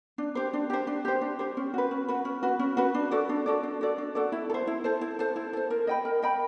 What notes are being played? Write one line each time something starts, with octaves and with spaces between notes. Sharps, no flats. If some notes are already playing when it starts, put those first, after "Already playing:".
D4
G4 C5
D4
G4 C5
D4
G4 C5
D4
G4 C5
C#4
F#4 B4
C#4
F#4 B4
C#4
F#4 B4
C#4
F#4 B4
D4
F#4 A4 D5
D4
F#4 A4 D5
D4
F#4 A4 D5
D4
F#4 A4 D5
E4
A4
C5
E4
A4 C5
E4
A4 C5
E4
A4 C5
A#4
D#5 G5 B5
A#4
D#5 G5 B5